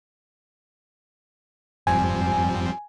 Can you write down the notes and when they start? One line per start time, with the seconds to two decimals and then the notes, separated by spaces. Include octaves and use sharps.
1.87 F#1 F2 G#2 F3 G3 C4 G#5